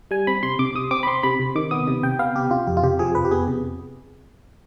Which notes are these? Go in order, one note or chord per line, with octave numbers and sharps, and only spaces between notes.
G3 G#5
C4 B5
C3 C6
C3 D6
C3 D#6
C4 D6
B5
C4 C6
C3 B5
C3
D#3 D6
B3 D#6
C3
C3 G5
B3 F5
C3 G4
C3 F4
F2 G4
F4
C3 G4
F3 G#4
F2 B4
G4
B3 G#4
C3